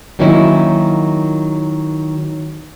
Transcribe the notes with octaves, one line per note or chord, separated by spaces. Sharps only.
D#3 F#3 A#3 C#4 D#4 E4